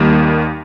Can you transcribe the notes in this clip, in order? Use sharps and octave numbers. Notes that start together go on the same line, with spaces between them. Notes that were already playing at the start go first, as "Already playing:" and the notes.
Already playing: D#2 D#3 G3 A#3